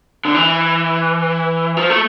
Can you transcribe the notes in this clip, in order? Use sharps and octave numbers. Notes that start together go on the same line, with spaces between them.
D3
E3
F3
A3